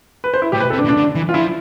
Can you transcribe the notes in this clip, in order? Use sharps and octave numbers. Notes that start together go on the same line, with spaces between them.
B4
C5
E4
A2 G4
B2 B4
C3 A4
D4
B2
D4
D3
E3
F4
F3 E4